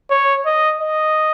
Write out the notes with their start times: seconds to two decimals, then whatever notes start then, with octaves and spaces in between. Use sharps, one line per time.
0.10 C#5
0.46 D#5
0.82 D#5